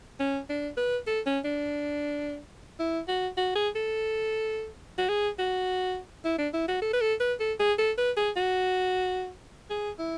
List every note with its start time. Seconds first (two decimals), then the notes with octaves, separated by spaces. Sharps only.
0.20 C#4
0.49 D4
0.77 B4
1.07 A4
1.26 C#4
1.44 D4
2.79 E4
3.08 F#4
3.37 F#4
3.55 G#4
3.75 A4
4.98 F#4
5.09 G#4
5.39 F#4
6.25 E4
6.38 D4
6.53 E4
6.68 F#4
6.82 A4
6.93 B4
7.01 A4
7.20 B4
7.40 A4
7.59 G#4
7.78 A4
7.98 B4
8.17 G#4
8.36 F#4
9.70 G#4
9.99 E4